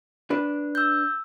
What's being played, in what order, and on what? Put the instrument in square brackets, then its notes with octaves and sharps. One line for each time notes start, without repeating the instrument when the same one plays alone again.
[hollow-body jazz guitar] D4 B4
[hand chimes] E6 G6